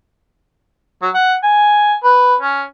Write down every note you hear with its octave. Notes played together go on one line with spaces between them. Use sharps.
F#3
F#5
G#5
B4
C#4